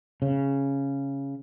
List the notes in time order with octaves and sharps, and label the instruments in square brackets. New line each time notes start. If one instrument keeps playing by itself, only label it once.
[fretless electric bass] C#3